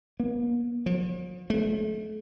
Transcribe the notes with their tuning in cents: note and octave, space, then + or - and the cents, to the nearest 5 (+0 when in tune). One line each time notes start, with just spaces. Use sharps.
A#3 +45
F3 +45
A3 -40